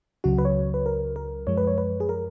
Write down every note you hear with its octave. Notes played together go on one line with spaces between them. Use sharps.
C#2 C#3 F#3 F#4
B4
C#5
B4
A#4
A#4
F#2 F3 G#3 C#5
B4
C#5
B4
G#4
A#4